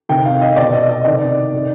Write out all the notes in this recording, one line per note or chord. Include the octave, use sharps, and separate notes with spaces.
C3 D#3 G5
F5
D#5
B2 D5
D#5
D#5
C3 D#3 D5
C3 D#3